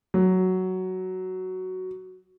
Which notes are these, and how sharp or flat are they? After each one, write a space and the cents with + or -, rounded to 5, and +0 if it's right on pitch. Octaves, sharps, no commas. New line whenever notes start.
F#3 +5